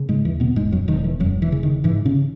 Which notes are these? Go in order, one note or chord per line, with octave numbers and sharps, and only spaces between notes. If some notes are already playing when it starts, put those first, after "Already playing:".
Already playing: C#3
G#2 G#3
D#2 E3
B2 B3
E1 G#2 G#3
F#2 F#3
E1 D#3
E3
E1 F#2 F#3
E3
C#3
D#3
G#2 E3
C#3 C#4